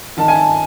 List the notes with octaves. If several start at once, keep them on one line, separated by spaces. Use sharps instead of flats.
D#3 A5
G#5
A5